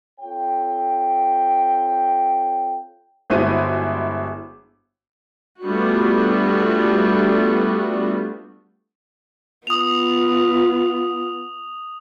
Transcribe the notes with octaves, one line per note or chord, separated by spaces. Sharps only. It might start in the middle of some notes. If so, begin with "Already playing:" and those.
C4 F4 A4 C#5 G5
G1 G#3 E4 F#4 C5 D#7
G3 A3 B3 D4 F4 F#4
B3 F4 D#6 F7